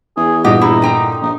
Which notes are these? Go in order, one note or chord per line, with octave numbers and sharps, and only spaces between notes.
E2 G#4
G2 A#2 G4 D#5 F#5
D#4 E4
D3 G5 A#5
A#1 D#4